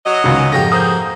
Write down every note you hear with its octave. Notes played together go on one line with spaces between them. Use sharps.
F#3 D#5
G#1 C#2 F#2
F2 G#2 B3 G4 A#6
A#3 G#4 C5 D#6 G6